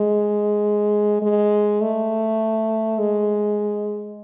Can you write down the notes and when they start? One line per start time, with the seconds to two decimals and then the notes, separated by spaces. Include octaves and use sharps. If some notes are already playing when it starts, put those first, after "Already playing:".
Already playing: G#3
1.22 G#3
1.81 A3
2.99 G#3